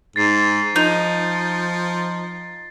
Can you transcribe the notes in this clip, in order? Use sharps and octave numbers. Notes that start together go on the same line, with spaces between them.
G#2 A6 C7
F3 D#4